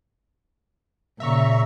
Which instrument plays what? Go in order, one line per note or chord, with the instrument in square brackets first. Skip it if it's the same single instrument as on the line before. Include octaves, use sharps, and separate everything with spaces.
[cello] A#2 C#3 [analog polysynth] E5 A#5 C#6